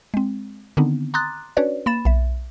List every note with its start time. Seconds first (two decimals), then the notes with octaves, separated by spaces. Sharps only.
0.14 G#3 C4
0.77 D3 D#3 B3 C4 D4 D#4
1.14 A#5 C6 D6 D#6 F#6 A6
1.57 C#4 D4 F#4 B4 C#5 D5
1.86 A#3 B5 A6 E7
2.05 B1 E5